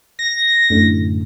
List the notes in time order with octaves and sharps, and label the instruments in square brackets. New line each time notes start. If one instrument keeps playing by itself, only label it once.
[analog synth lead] A#6
[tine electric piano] F#2 [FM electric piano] A2 D3